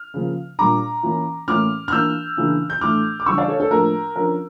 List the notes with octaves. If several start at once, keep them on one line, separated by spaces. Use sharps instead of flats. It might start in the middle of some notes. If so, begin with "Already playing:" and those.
Already playing: F6
C#3 F3 A#3
A#2 G3 D4 A#5 D6
E3 A#3 C#4
A2 E3 A#3 C#4 D6 F6
F6
E3 A#3 D4 E6 G6
C#3 E3 A#3 D4
G6
A2 E3 A3 D4 D6 F6
D6
C#3 E3 G3 D4 C#6 E6
D5 F5
A4 C#5
A4
A2 F3 A#3 D4 A#4
D3 F3 C#4 A#4